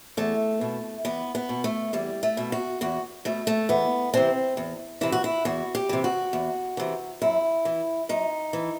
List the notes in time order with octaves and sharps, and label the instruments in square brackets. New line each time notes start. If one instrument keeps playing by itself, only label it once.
[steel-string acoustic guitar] E2 A3
B2
E2 B3
B3
B2
A3
E2 G3
A3
B2
F#4
E2 F#4
B2 A3
A3
E2 B3
C3 E3 C4
E2
C3 E3 E4
F#4
E4
E2 F#4
G4
C3 E3
F#4
E2
C3 E3
F#2 E4
E3
F#2 D#4
E3